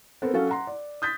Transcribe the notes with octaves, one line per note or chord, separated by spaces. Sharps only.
B3 C4 A4 A#4
F#3 C#4 F#4 A4 F5
F#5 A#5 C6
D5
D#6 G6 A6 B6